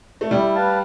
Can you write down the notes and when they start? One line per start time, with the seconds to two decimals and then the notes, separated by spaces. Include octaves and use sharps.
0.21 A3
0.31 G3 E4
0.55 B4 F5 A5